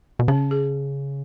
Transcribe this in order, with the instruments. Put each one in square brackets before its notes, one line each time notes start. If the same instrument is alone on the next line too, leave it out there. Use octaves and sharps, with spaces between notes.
[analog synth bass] B2
[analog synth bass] C#3 [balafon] C#4
[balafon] G#4